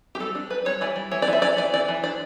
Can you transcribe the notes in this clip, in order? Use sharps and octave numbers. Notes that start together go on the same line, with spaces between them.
G4
G3 A4
D4
G3 B4
G3 C#5
E3 D5
G3
E3 C#5
D5
E3
E5
C#4 D5
E3 D5
E3 D5
E3
D4 D5